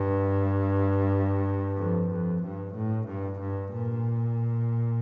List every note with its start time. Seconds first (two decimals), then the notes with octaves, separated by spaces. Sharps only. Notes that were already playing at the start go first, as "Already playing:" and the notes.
Already playing: G2
1.77 F2
2.10 F2
2.43 G2
2.75 A2
3.07 G2
3.40 G2
3.73 A#2